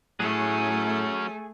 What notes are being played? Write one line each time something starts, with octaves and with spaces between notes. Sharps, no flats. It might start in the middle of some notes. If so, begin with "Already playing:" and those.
A2 F#3 A3 C#4 G#4